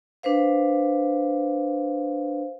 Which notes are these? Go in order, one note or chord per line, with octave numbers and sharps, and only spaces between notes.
D4 B4 C5 F5